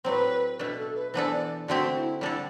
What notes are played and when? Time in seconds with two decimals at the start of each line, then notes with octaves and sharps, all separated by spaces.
0.04 A2 F#3 C4 B4 C5
0.59 B2 A3 D4
0.78 A4
0.95 B4
1.14 E3 B3 D4 A4 C5
1.32 D5
1.68 D3 A3 C4 F#4 G4
1.96 E4
2.21 D3 G3 D4 E4 A4